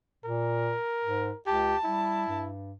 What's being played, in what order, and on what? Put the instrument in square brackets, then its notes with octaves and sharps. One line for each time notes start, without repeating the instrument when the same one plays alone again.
[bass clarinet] A#2 [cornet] A#4
[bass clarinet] G#2
[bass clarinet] C#2 [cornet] G4 [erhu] A5
[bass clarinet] G3 [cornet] E4
[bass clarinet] G2